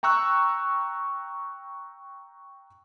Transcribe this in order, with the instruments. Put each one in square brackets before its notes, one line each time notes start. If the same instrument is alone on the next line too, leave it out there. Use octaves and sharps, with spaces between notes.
[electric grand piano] G5 A#5 C#6 E6 F#6